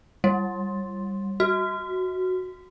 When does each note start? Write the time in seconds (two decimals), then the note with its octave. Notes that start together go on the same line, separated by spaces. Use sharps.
0.24 G3
1.40 F#4